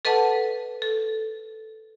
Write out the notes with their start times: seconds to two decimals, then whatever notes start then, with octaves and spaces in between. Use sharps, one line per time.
0.05 A4 B4 D#5 F#5 A5
0.82 A4